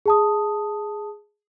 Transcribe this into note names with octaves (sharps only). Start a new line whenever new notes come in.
G#4 A5 D#6